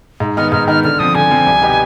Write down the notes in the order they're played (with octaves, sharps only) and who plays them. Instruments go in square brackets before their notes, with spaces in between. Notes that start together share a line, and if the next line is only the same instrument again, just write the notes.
[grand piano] G#2
[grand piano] D#3 B3 D#4 [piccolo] F6
[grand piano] G#2 [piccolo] F6
[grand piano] D#3 B3 D#4 [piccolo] F6
[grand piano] D3 [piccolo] F6
[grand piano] F3 C4 [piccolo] D#6
[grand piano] D3 [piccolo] G#5
[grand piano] F3 C4
C2
B2 B3 D#4 G4